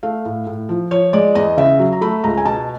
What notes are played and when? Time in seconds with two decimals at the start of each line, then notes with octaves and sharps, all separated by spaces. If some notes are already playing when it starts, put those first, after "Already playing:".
0.03 A3 F5
0.25 A2
0.47 A2
0.69 F3
0.91 F3 C#5
1.13 G#3 D5
1.35 E2 D#5
1.57 C#3 E5
1.79 F#3
1.92 A#5
2.01 A3 B5
2.24 C#2 A#5
2.37 G#5
2.45 B2 A5